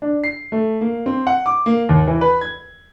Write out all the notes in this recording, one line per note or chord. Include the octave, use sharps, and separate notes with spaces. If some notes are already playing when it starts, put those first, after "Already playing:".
D4
C7
A3
A#3
C4
F#5
D6
A#3
D#2
E3
B4
G#6